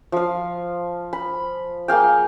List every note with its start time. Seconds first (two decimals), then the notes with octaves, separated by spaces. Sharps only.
0.12 F3 F5
1.13 B5
1.88 A#3 G#4 F5 G5